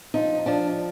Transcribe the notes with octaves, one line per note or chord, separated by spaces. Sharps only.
F3 D#4
F3 D4